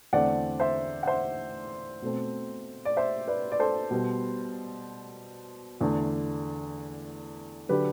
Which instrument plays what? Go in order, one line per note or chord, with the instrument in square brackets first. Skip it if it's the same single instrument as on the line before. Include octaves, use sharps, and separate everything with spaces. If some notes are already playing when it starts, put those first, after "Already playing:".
[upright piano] E2 D3 A3 C4 D5 F#5
C5 E5
F#5
C5 E5
B2 A3 C4
D5
C5 E5
B4 D5
D5
A4 C5
B2 G3 B3
E2 D3 A3
D3 F#3 G4 B4